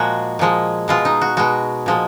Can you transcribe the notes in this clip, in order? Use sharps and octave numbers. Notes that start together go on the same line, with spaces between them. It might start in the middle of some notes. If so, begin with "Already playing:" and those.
Already playing: A#2 F3 G#3 F#4 G#4 A#4
A#2 F3 G#3
B2 G#3 F4
D#4
F#4
B2 G#3 F#4
A#2 F3 G#3